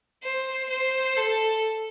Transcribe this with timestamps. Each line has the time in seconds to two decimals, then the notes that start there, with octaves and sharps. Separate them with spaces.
0.24 C5
0.70 C5
1.16 A4